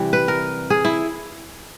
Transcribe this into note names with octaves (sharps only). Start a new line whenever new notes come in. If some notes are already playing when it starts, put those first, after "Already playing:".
Already playing: C3 E3 G3
B4
A#4
G#4
E4